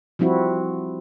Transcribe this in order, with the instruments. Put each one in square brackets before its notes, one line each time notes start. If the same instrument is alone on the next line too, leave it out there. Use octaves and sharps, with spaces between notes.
[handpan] F3 G3 C4 E4 F#4